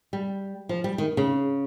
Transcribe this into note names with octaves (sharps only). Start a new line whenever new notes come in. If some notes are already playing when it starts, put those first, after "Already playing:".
G3
F3
G3
D#3
C#3